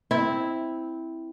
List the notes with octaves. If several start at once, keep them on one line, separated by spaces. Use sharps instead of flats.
C4 E4